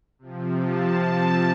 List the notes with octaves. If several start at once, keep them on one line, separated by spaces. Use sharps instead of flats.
C3 F3
A5